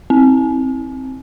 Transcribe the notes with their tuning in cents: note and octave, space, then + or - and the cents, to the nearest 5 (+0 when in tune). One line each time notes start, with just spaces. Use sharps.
C4 +10